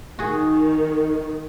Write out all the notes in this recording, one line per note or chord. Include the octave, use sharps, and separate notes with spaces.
D#3 F#4 G#4